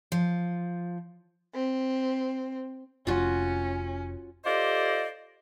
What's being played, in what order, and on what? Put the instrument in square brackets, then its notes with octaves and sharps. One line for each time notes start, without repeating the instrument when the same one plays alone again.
[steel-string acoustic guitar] F3
[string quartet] C4
[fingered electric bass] F1 [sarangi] C#4 [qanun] F4 F#4
[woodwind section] F4 G4 A4 C5 D5 D#5